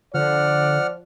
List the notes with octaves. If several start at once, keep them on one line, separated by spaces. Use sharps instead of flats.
D3 F3 D5 F#5 F6